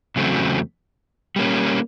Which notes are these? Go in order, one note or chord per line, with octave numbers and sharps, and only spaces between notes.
E2 C#3 F#3 A3 C4
G3 A#3 C#4